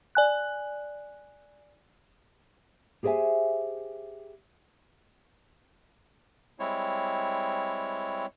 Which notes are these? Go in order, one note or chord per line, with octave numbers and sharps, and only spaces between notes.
D5 G#5 F#6
G4 G#4 C5 D#5 E5 G#5
G3 G#3 C4 E4 C#5